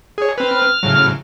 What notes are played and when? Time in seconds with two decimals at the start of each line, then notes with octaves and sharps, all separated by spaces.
0.18 G#4 C#5
0.38 C4 B4 F6
0.83 A2 C#3 F#3